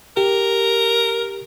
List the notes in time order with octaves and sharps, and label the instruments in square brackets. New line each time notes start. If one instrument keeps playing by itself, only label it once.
[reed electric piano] G4 [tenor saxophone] A#4